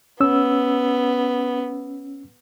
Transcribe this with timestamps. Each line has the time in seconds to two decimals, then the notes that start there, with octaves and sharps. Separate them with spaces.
0.20 B3 C#4 E6